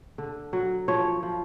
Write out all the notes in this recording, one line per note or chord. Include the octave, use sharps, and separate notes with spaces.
D3
F#3
F3 C#5
F3